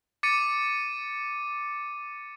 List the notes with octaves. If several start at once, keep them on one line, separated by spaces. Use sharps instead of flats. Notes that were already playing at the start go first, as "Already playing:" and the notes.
D6 A6 C#7 D#7